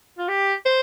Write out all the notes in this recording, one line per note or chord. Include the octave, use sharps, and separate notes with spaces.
F4
G4
C5